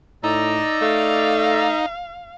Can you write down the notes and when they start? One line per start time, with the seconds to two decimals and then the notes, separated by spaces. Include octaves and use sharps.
0.24 A2 D#4 D5 A#5 E6
0.82 A3 F5